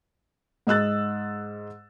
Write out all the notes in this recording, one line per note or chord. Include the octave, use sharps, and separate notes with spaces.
G#2 D#5 E6 F#6 A6